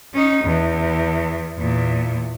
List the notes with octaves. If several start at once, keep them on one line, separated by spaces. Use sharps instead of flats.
C#4 D#4
E2
E2 A#2